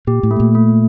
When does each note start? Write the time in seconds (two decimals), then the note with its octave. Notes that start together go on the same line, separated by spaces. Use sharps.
0.07 A#2 G4
0.23 A2
0.31 A3
0.40 A#2
0.55 A3